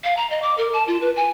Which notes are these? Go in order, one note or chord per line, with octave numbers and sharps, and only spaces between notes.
F5
A#5
D#5
D6
A#4
A5
F4
B4
G#5